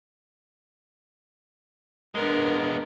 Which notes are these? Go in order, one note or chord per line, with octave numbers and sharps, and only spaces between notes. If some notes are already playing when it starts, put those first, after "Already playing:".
G#3 B3 D4 A#4